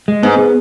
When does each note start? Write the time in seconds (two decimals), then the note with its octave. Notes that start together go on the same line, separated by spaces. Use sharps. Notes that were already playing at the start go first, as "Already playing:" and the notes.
0.08 G#3
0.23 G#2 B3
0.38 B3